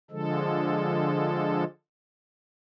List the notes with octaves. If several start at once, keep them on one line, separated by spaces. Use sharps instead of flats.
D3 F3 G#3 A4